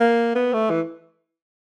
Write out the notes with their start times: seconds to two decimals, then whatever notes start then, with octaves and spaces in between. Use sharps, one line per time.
0.01 A#3
0.35 B3
0.53 A3
0.70 E3